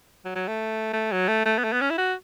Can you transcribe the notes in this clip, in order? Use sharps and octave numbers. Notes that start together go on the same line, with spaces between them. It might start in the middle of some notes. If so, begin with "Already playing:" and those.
F#3
F#3
A3
A3
F#3
A3
A3
B3
A3
B3
C#4
E4
F#4